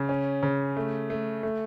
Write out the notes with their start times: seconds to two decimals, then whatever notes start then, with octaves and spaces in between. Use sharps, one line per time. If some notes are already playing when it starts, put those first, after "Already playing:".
Already playing: C#3
0.09 C#4
0.43 C#3
0.77 A3
1.10 A3
1.43 A3